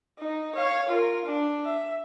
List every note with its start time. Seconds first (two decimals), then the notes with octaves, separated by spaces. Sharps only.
0.19 D#4
0.55 C#5 F5
0.88 F4 A#4
1.25 D4
1.65 E5